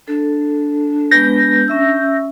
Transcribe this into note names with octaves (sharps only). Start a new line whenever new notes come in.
D4 A4
G#3 B3 B4 G6 A#6
C#4 E5 E6